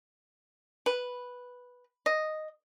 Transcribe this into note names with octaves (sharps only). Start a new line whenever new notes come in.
B4
D#5